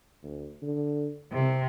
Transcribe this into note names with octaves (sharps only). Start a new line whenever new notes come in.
D2
D3
C2 C3